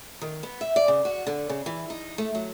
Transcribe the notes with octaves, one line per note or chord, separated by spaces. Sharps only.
D#3
B3
E5
D5
C#3
F#4
D3
C#3
E3
D#4
A3
F#3